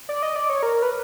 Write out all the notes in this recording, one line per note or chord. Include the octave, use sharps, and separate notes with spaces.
D5
D#5
D5
C#5
A#4
B4